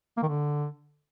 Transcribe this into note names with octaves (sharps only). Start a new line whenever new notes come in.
A#3
D#3
D3